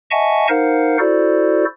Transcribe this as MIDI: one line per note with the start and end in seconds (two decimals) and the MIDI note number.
0.11 0.47 75
0.11 0.47 76
0.11 0.47 78
0.11 0.47 80
0.11 0.47 81
0.11 0.47 85
0.49 0.97 63
0.49 0.97 70
0.49 0.97 72
0.49 0.97 77
0.49 0.97 78
0.99 1.65 64
0.99 1.65 66
0.99 1.65 69
0.99 1.65 72
0.99 1.65 74